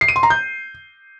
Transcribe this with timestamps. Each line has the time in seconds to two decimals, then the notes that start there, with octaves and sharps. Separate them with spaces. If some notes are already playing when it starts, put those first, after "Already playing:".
0.01 C7
0.08 D#7
0.16 C6
0.23 A#5
0.30 G6